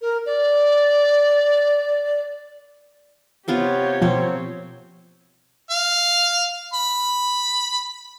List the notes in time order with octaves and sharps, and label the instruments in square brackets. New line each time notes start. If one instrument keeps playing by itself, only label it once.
[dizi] A#4
D5
[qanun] C3 B3 F4 [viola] G4 C#5
[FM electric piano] B2 [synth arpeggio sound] F3 [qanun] A#3 C4 C5
[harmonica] F5
B5